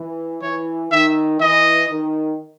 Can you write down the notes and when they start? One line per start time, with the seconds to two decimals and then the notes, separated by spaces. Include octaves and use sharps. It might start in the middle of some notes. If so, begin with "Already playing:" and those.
Already playing: E3
0.42 E3 C#5
0.91 D#3 E5
1.41 E3 D#5
1.90 D#3